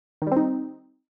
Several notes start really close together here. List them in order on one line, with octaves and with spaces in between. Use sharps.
D#3 G3 C4 D#4